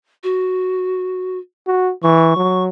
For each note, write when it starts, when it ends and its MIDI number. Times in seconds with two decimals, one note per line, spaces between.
0.23 1.38 66
1.67 1.92 66
2.03 2.36 52
2.03 2.63 85
2.37 2.69 54